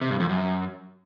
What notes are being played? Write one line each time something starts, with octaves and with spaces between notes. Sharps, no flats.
C3
G2
F2
F#2